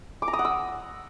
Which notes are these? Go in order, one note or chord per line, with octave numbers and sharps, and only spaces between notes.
D6
A#5
D#6
F#5
E6